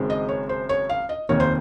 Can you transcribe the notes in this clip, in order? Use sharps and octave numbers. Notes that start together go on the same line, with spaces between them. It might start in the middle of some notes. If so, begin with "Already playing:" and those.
Already playing: F#1 F#2 D#3 G#3 C4
D#5
C#5
C5
C#5
F5
D#5
F1 D#2 D#3 A#3 C#5
C5